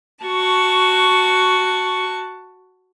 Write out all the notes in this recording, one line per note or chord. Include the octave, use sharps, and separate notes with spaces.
F#4 A5 C#6